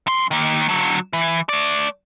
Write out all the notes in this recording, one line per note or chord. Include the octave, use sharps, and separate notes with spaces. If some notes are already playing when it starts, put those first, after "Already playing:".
F#2 C6
D#3 A#3
D3 F#3
E3
A3 D5